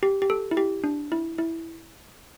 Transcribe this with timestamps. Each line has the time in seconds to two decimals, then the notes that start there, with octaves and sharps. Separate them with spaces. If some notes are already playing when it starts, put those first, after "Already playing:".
0.03 G4
0.22 G4
0.30 A4
0.51 E4
0.57 G4
0.84 D4
1.12 E4
1.38 E4